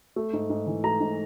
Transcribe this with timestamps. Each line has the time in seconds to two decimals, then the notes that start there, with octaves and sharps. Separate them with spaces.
0.16 A3
0.33 G#2
0.50 G#2
0.67 E3
0.84 A3 A#5
1.00 G#2